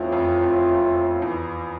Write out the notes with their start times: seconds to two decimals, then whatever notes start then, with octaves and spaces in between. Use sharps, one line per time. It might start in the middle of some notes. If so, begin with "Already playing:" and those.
Already playing: E2 A2 F3 A3 C4 F4
0.12 F2
0.44 F2
0.75 F2
1.22 E2